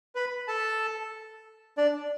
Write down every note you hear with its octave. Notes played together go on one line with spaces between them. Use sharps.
B4 B5
A4 A5
D4 D5